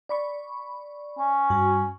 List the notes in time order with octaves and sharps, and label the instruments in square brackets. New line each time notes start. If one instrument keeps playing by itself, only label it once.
[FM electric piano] D5 B5 C#6
[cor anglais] C#4
[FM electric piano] G2 F#4